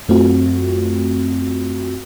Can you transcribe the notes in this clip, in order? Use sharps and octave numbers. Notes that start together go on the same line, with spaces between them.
F#2 A3 C4 F4 F#4